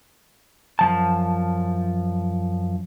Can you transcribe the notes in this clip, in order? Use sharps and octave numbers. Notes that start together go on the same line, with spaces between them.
F#2 F3 A5